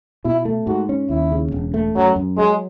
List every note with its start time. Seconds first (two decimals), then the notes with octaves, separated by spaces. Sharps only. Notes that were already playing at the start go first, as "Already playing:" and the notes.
0.25 B2 E4
0.45 A3
0.67 G#2 F#4
0.89 C#4
1.10 D#2 E4
1.32 C#3
1.52 E1
1.74 A3
1.96 F#2 F#3
2.16 F#2
2.38 F#3 G#3